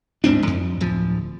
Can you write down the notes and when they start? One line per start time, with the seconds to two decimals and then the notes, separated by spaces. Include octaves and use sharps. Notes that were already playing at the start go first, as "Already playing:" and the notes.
0.24 D1 G#2 C4 D4
0.47 F2
0.81 D1 F3